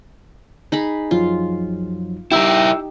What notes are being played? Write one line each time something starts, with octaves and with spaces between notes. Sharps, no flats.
D#4 G#4 B5
F#2 F3 F#3 F4
D#4 E4 G4 A#4 G5 E6